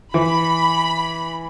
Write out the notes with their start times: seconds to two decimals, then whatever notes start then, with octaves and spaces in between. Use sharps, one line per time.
0.14 E3 B5